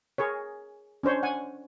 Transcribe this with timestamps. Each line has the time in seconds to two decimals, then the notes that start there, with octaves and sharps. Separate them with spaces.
0.18 G#4 A#4 C#5
1.03 C#4 D4 C5 C#5
1.23 F#5 G#5